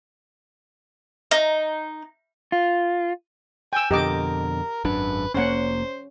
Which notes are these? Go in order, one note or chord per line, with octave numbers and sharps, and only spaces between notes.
D#4
F4
G5 G#5 E6
F2 B2 D3 G4 A#4 D#5 D6
G#1 F#2 D4 B4
F1 A#3 C#4 C5 F#5